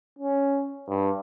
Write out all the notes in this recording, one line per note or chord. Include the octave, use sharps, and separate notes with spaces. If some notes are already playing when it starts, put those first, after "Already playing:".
C#4
G2